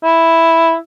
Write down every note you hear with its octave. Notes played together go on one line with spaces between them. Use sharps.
E4